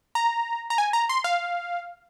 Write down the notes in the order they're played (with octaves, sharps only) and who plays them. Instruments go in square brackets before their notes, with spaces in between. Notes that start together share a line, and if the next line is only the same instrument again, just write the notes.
[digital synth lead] A#5
A#5
G#5
A#5
C6
F5